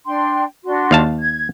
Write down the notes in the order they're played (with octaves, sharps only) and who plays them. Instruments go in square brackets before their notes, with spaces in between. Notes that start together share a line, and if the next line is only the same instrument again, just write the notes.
[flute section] D4 G5 C6
D4 F#4 C6
[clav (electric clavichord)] D#2 F5 A5
[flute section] G#6